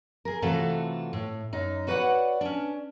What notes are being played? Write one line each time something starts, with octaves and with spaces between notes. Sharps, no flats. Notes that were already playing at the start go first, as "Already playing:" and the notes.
G#4 A#4
C3 E3 A3 F4 F#4 A4
A2
F#2 D#4
F#4 B4 C#5 D5 F#5
C#4 D4